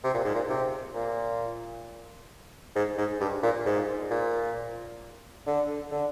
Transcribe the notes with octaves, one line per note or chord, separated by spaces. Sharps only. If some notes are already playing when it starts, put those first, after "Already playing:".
C3
A#2
G#2
A#2
C3
A#2
G#2
G#2
G2
A#2
G#2
A#2
D3
D3